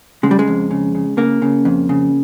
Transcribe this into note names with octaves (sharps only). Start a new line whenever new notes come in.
C#3 G#3
G3
G#3
F2
C#3
C#3
C#3 A#3
C#3
F2
C#3